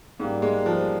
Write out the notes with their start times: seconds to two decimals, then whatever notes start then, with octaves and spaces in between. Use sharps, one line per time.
0.20 G#2 G3 A#3
0.42 G#3
0.66 F3